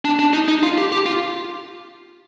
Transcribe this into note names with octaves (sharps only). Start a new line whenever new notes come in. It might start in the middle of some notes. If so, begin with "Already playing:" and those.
D4
D4
D#4
D#4
F4
G4
G4
F4